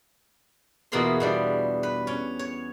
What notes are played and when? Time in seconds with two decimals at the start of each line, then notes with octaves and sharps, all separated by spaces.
0.92 E2 B2 A#3 F4 G#4 C6
1.20 B2 G3 D4
1.83 B4
2.07 C#4
2.39 C#5